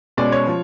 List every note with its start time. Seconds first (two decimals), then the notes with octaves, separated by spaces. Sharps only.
0.17 B2 G#3 C#4 D5
0.32 C#5
0.47 F3